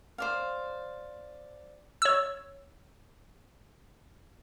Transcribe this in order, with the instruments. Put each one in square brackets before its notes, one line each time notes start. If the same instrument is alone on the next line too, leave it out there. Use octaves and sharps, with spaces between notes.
[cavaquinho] C5 D5 F5
[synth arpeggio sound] C#5 E6